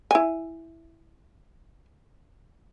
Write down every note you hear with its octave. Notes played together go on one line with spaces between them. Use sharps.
E4 G#5